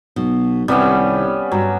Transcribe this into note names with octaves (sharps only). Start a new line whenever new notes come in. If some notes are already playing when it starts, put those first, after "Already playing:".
B1 B2
C2 C3 D#3 G3 B3 C#4
G2 F#3